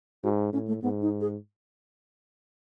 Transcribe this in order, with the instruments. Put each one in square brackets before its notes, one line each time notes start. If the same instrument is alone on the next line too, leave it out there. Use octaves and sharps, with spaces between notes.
[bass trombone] G#2 [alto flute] F#4
[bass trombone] A2 [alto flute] C#4
[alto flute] A3
[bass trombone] G#2 [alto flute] B3
[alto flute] D#4
G#4